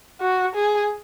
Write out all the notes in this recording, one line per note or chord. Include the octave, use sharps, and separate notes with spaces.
F#4
G#4